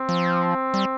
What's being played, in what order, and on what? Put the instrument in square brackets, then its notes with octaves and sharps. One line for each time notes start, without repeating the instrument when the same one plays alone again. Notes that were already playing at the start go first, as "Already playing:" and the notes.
Already playing: [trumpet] C4
[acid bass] F3
G3